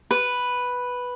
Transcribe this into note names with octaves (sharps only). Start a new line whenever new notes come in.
B4